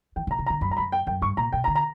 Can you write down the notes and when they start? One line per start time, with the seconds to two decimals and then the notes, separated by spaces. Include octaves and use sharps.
0.16 E3 G5
0.27 D3 A#5
0.39 C#3
0.46 A#5
0.50 D3
0.61 F#2 B5
0.70 G2 A#5
0.77 F#2 B5
0.92 G5
1.07 F#2 G5
1.22 G2 C#6
1.37 A#2 A#5
1.52 B2 G5
1.64 A#5
1.68 D3
1.75 A#5